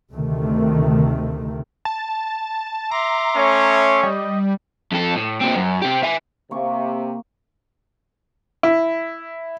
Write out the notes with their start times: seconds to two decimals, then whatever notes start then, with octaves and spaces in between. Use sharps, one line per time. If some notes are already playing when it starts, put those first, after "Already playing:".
0.12 D2 C3 D#3 A3
1.85 A5
2.91 E5 A#5 C6 D6
3.36 A3 C#4 C#5
4.03 G3 D#5
4.91 F2 A4
5.15 A2
5.40 A#2 C4
5.56 F#2
5.82 C3 G4
6.03 E5 G#5
6.51 C3 A#3 C#6 D6
8.63 E4